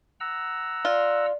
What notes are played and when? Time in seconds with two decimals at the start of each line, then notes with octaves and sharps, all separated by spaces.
0.20 F#5 A#5 E6
0.85 F4 D5